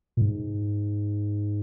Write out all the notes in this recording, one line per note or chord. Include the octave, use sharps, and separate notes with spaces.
A#2
G#2